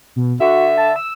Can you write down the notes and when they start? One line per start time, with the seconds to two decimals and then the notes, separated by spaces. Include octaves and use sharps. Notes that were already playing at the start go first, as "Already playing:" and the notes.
0.16 B2
0.40 D3 F#4 E5
0.77 A5
0.96 E6